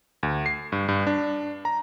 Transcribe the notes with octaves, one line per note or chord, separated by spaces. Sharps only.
D2
C7
G2
G2
D4
A#5